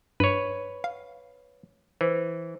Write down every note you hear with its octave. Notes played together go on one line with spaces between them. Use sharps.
G2 B4 C#5
F5
E3 C5